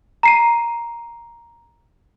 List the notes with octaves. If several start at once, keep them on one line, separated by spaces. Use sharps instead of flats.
A#5 C7 D#7